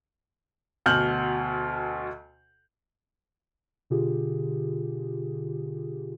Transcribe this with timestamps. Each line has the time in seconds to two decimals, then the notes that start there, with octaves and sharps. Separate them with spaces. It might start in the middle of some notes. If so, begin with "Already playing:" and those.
0.86 D2 B2 F6 G6 F#7
3.90 B2 D3 F4 G4 G#4